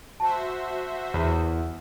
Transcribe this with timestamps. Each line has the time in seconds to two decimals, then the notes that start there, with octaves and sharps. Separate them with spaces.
0.20 F#4 C5 E5 A5
1.14 E2